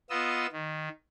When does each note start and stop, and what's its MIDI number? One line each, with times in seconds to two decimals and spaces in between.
0.10 0.46 59
0.10 0.46 65
0.10 0.46 75
0.10 0.46 88
0.52 0.89 51